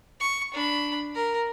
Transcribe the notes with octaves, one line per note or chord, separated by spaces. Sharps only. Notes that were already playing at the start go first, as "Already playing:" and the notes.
C#6
D4 B5
A#4